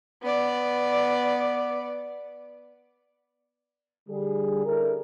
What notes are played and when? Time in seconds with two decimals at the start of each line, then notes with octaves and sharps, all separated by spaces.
0.23 B3 D5
4.08 D3 G3 G#4
4.65 C#4 D4 E4 A4 A#4